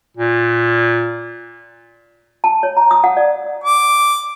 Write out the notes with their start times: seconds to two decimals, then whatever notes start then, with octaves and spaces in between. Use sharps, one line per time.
0.17 A#2
2.44 A5
2.63 C#5
2.77 A#5
2.91 D#6
3.04 F#5
3.17 D5
3.64 D6